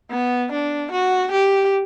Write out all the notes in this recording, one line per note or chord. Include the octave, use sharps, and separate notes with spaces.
B3
D4
F#4
G4